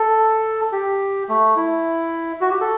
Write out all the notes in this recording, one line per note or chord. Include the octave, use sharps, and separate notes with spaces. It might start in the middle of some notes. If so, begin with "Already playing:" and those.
Already playing: A4
G4
A3
E4
F#4
G4
A4